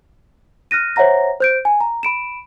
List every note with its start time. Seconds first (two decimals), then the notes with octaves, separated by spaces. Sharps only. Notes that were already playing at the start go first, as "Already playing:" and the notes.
0.71 F6 F#6 A#6 D#7
0.96 C5 C#5 E5 F#5 A#5 A#6
1.41 C5 G6 D7
1.65 G#5
1.81 A#5
2.03 B5 D7 E7